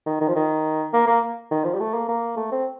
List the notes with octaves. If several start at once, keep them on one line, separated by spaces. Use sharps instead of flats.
D#3
D#3
F3
D#3
A#3
A#3
D#3
F3
G3
A3
A#3
A#3
A3
C4